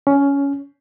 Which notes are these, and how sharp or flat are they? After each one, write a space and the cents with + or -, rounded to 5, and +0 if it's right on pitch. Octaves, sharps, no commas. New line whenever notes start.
C#4 +15